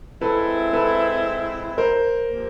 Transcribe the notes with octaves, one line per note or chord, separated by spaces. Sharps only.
G#3 C4 E4 A4 B4
A4 B4
A#4 C5
C3 F3 A#3